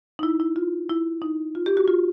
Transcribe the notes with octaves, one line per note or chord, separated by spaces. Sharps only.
D#4
E4
E4
F4
E4
D#4
F4
G4
F#4
F4